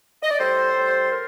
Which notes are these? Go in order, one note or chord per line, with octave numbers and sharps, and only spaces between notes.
D#5
D5
A2 G3 A4 C5
A2 G3
A#4